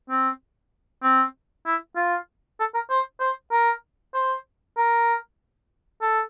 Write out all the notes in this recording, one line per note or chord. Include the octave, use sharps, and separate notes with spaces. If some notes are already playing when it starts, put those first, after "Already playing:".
C4
C4
E4
F4
A4
A#4
C5
C5
A#4
C5
A#4
A4